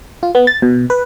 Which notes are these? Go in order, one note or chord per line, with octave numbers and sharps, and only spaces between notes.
F4
B3
A6
B2
B4